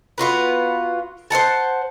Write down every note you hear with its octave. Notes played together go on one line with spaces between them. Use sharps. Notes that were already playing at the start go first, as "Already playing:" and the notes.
B3 F4 F#4 B4
C5 D5 F#5 A5